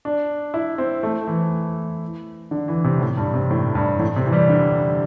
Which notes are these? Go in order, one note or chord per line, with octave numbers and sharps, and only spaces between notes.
D4
E4
C4
A3
E3
D3
E3
C3
A2
G2
C3
A2
G2
A2
C3
E3
G3
D3